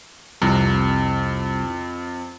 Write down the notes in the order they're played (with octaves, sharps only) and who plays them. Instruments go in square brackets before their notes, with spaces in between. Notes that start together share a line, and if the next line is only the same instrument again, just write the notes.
[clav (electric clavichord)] C2 A#5 [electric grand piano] F2